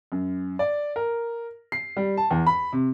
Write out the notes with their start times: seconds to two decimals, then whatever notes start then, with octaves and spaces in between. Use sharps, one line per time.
0.12 F#2
0.59 D5
0.96 A#4
1.72 C7
1.97 G3
2.17 A5
2.31 E2
2.47 B5
2.73 C3